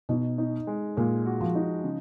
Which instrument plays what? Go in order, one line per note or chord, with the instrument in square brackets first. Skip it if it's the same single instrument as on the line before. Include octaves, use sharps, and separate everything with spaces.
[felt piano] B2 [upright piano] D#4
[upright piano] D#4
G#3
[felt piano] A#2 [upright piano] G#3
[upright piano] F#4
[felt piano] F3
[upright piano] D#4
C#3